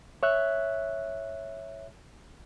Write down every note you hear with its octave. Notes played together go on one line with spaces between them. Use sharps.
C#5 E5 F#6